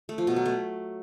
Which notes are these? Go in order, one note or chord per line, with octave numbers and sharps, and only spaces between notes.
A3
F3
B2
F#3
A3